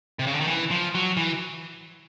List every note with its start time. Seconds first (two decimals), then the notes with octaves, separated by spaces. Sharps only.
0.19 C3
0.27 C#3
0.34 D3
0.41 D#3
0.47 E3
0.71 F3
0.95 F#3
1.17 E3